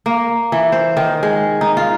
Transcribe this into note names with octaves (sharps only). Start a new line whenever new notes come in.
A#3
E3
C5
D#3
G#3
D#4
F4